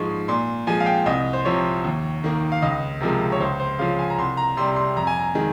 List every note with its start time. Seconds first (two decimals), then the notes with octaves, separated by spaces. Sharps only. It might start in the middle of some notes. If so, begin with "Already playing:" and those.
Already playing: G#2 F3 G#3 C#6
0.28 A#2 C6
0.67 F3 G#3 G#5
0.80 F5
0.86 G5
1.06 C2 D#5
1.33 C5
1.45 C3 F3 C#5
1.84 D#2
2.24 D#3 A#3
2.52 F5
2.62 C#2 D#5
3.01 C3 F3 G#3 A#4
3.32 C#5
3.40 C#2 C5
3.60 C5
3.79 C#3 F3 F5
3.99 G#5
4.10 A#5
4.18 C2 C6
4.37 A#5
4.57 C3 G3 C6
4.76 C6
4.96 F2 A#5
5.07 G#5
5.19 A#5
5.35 D#3 G#3